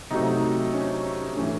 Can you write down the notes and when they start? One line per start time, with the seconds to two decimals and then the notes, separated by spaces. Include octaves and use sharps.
0.11 C3 F#3 A3 D#4
0.73 C#4
1.36 A2 E3 A3 C#4